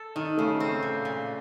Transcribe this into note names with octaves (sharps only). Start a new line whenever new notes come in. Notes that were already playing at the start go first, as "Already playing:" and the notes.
Already playing: A4
D#3 D#4
C#3 A3
C4
A#2
A#2